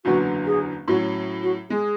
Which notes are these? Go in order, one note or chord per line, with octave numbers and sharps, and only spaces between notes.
F#1 E2 D3 F#3 B3 F#4
G#4
A2 F#3 C#4 F#4
F#4
G#3 G#4